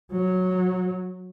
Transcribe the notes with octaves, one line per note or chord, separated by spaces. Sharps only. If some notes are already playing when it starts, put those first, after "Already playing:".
F#3